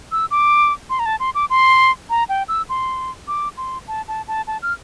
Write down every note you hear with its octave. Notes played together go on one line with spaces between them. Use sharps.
E6
D6
C6
A#5
A5
C6
D6
C6
A#5
G5
E6
C6
D6
C6
A5
A5
A5
A5
F6